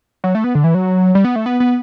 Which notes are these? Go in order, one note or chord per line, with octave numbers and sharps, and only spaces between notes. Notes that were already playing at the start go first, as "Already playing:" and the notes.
F#3
A3
B3
D3
E3
F#3
G3
B3
A3
B3
B3